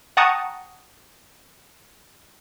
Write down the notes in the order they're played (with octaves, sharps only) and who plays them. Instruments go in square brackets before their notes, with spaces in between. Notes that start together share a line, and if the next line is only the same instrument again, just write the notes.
[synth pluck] F#5 G5 A5 A#5 C#6 D#6